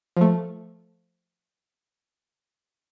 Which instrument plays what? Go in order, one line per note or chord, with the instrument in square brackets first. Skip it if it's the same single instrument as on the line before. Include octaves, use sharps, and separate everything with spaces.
[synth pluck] F3 A3